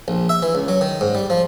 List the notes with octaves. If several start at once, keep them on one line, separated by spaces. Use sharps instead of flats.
A#1
E5
E3
C#2
F#3
D#3
G#2
G3
F3